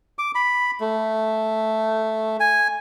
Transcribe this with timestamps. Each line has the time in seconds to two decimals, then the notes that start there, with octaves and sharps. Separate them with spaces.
0.19 D6
0.35 B5
0.80 A3
2.40 G#5